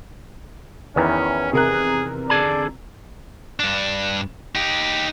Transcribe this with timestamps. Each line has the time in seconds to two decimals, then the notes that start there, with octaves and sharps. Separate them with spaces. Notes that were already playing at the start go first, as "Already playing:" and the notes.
0.96 E2 D#3 E3 C#4
1.53 C3 G#4 A#4 F#6
2.30 D3 G#4 D5 A5
3.60 G2 D4
4.55 D#4 G4